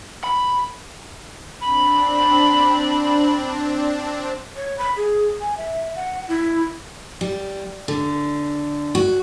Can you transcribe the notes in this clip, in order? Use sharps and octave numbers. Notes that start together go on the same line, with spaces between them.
B5
C4 D4 B5
C#5
B5
G#4
G#5
E5
F#5
E4
G3
D3
F#4